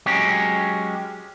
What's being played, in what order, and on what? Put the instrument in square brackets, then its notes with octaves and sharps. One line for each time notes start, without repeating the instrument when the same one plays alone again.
[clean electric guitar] F#3 G#3 C#4 G4